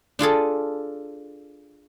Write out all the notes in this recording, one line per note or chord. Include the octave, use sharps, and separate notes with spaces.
D4 F4 G#4 A4